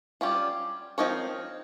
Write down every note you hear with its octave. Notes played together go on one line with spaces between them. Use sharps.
G3 C#4 F4
F3 C4 D#4 A#4 C#5